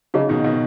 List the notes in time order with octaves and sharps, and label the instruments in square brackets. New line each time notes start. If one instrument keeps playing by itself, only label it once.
[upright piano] C#3 F#3 [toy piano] D#4 G#4 D#5
[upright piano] B2 D#3
B2 D#3